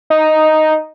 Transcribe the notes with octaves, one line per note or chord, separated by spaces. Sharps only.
D#4